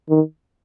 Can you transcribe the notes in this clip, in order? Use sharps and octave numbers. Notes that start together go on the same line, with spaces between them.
D#3